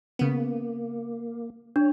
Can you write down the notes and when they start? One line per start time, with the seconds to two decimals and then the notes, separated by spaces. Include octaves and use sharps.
0.19 C#3 A#3 B3
1.76 D4 C#5